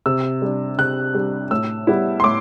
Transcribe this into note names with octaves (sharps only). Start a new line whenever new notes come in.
C3 E6
G3 D4
C3 F#6
G3 D4
A2 E6
G3 B3 E4
C6
A2 D6